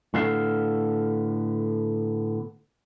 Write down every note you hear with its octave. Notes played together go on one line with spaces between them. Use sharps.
A2 D3 B3 A4 F5